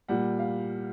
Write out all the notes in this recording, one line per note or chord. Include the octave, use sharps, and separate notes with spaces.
A#2 G3 F#5
F5